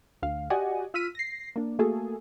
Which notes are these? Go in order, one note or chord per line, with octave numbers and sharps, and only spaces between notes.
D2 F5
F#4 G4 D5 D#5 F#5 G#5
F4 E6 F6 B6 D#7
A#6 C7
A#3 D4
A3 A#3 F#4 G#4 A4